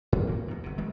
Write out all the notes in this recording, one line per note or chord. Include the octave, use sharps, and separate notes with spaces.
G#2
D2 A#3
E2 B2
G1 C3
B1 D#3 G#3 A3